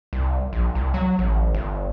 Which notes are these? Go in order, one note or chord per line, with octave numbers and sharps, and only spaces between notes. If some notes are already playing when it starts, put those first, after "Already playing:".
C2
A#1
C2
F#3
A1
G1